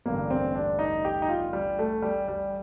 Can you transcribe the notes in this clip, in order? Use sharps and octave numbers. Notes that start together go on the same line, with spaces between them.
A1 G2 D3 A#3
C4
D4
D#4
G4
D#4
F4
G3
A3
G3
G3